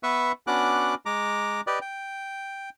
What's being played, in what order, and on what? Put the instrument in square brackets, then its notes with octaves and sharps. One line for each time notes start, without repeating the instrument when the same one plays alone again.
[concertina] B3 B4 E5 C#6
B3 C#4 D4 F#4 D6 F#6
G#3 A#5 D6
G4 B4 D5 D#5
G5